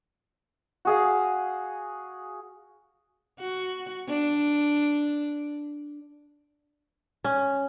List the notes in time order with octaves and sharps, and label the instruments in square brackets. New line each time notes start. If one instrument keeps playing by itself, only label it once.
[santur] F#4 G#4 F5
[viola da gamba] F#4
D4
[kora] C#4